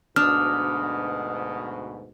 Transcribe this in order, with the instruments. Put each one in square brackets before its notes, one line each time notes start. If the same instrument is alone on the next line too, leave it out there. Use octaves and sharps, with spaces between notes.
[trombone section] D2 G#2 B2 [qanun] D4 [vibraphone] D#6 [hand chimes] F6